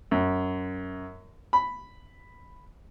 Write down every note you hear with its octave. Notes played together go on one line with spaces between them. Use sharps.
F#2
B5